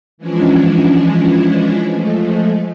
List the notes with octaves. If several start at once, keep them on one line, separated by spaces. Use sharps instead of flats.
E3 F3 G#3 C#4 D4 E4
F3 G#3 A3